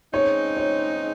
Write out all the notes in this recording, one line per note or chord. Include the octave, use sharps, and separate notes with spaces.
C#3 G#3 C4 D#4 C#5
C#5